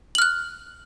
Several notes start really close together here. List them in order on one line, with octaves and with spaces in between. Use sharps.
F#7 F6 F#6